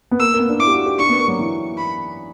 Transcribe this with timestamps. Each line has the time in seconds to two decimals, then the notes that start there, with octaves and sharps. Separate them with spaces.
0.11 B3
0.20 A#3 E6
0.34 A#3
0.39 B3
0.49 D4
0.59 E4 D6
0.67 G4
0.73 F#4
0.86 G4
0.99 D4 C#6
1.09 B3
1.19 A#3
1.28 F#3
1.39 E3
1.78 B5